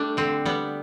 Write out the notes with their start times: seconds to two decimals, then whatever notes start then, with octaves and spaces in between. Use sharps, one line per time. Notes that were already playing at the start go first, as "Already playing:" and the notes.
Already playing: G3 A3 D4
0.17 D3 C4
0.45 G3 B3